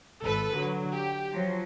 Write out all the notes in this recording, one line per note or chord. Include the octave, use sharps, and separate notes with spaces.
G#1 A4 B4
D3 F#3
G4
F3 F#3